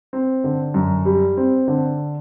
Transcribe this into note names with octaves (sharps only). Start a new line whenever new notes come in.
C4
D3
F#2
G3
C4
D3